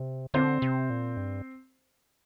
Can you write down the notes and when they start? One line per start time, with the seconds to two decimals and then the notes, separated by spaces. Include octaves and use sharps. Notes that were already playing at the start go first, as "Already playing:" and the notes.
Already playing: C3
0.34 D3 C4 C5
0.62 C3
0.90 A#2
1.17 G2